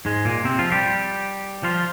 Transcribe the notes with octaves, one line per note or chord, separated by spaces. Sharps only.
G#2 G#3
A#2 A#3
C3 C4
F3 F4
G3 G4
F3 F4